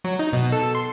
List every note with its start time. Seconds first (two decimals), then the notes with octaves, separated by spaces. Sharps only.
0.04 F#3
0.19 D#4
0.33 B2
0.52 A4
0.75 C6